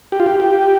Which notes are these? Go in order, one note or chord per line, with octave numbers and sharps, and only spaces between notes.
G4
F4
G4
G4